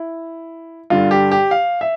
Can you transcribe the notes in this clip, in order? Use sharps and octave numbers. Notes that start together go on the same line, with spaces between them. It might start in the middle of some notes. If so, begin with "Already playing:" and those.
Already playing: E4
G2 D3 F4
G4
G4
F5
E5